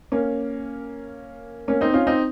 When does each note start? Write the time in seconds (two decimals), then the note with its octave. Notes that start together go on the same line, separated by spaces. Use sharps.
0.12 A#3 C#4
1.68 A#3 C#4
1.81 C4 D#4
1.94 C#4 F4
2.07 C4 D#4